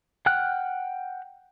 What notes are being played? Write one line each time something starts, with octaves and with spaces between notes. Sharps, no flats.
F#5 G5 F6 F#6